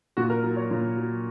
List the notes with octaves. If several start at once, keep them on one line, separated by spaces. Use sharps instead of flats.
A#2 F#4
A#4
F#3
C#5
A#2
F#3